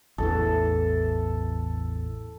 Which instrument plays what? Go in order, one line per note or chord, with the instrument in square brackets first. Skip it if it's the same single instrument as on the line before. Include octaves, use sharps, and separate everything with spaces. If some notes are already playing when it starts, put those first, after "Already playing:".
[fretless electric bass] A1 E2 E3 [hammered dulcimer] A4